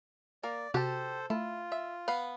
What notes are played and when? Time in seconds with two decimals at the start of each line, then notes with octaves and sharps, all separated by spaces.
0.43 A#3 A#4 D5
0.74 C3 F#4 G4 A4 C5 A5
1.30 A3 E4 F4
1.72 E5
2.08 B3 B4 F5